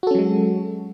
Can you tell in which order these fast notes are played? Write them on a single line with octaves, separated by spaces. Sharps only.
F#4 A4 C#4 F#3 G#3